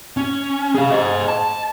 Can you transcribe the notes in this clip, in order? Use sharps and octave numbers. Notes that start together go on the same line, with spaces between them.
C#4
G#4 F5
C5 D#5
A5